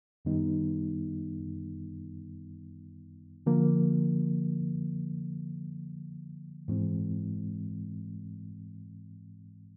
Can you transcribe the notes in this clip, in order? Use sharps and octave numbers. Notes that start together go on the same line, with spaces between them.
F#2 D#3 G3 B3 D#4
D3 F3 A#3
G#2 E3 G#3 C4